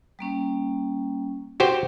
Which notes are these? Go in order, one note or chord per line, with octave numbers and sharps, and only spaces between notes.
G3 A#3 C#4
F#4 G4 C5